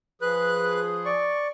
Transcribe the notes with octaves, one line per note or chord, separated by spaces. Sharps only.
F3 G#4 B4 F#6
D5 C#6